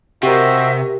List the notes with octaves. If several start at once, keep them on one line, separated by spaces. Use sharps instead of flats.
C3 F#4 G4 A#4 C5 D#5 E5